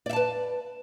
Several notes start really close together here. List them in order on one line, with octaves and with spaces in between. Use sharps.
D5 E5 A5 B4